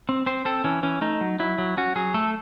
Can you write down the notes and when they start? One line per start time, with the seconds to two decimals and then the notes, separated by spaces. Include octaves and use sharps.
0.09 C4
0.26 C4 C5
0.45 C4 A4
0.64 E3 C#4
0.83 E3 C#4
1.01 A3 D#4
1.21 F#3
1.39 F#3 E4
1.58 F#3
1.77 C#4 F#4
1.96 F#3 G#4
2.14 A3 A4